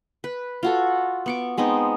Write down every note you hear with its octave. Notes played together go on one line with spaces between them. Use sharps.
B4
F4 F#4 A4
B3 C#6 D6
G#3 B3 C4 D#4